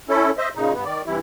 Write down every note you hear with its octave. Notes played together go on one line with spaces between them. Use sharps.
C#4 E4 A4
C5 D#5 E5
A#2 C#3 D#4
G2 B3
D#3 D5
G2 C3 E3 E4